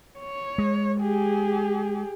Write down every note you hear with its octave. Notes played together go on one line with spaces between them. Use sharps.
C#5
G#3
G4 G#4